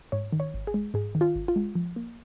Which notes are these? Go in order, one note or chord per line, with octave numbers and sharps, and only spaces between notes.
G#2 C#5
D#3
C#5
G#1
G#4
G#3
G#2 G#4
D#3
F4
G#1
F4
G#3
F3
A#3